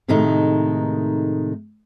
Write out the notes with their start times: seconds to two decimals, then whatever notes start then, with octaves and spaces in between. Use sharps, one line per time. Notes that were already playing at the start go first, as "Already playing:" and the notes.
0.08 A2 C3 D#3 G#3 A3 D#4